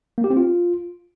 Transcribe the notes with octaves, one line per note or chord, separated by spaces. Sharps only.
A#3
G4
C4
F4